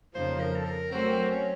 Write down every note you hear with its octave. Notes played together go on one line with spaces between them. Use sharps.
F2 C#3 F3 A#3 D#4 C5
A#4
A4
A#4
F#3 A3 C4 F#4 A#4 C5
C#4